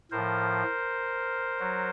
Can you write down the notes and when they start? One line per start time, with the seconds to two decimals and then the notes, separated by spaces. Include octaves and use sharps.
0.11 A2 F3 A#4 C5
1.59 F#3